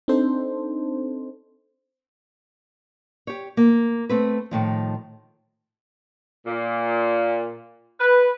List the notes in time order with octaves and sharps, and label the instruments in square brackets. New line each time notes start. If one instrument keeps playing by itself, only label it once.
[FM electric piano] C4 D4 D#4 A4 C5
[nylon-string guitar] G4 C#5
A#3
A3 C4 B4
A2 D#3 F3
[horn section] A#2
B4